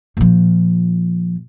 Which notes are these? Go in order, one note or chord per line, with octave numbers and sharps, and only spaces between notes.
A#2 F3